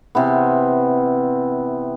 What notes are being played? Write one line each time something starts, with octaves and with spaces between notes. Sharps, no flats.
C3 E3 B3